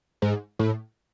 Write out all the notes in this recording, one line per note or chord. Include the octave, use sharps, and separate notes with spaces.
G#2
A2